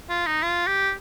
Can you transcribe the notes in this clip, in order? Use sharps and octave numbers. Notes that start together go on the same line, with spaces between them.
F4
D#4
F4
G4